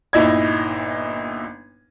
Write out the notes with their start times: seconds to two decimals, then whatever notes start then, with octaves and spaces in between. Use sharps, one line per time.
0.13 G1 A#2 D#4 E4 D#5 G#6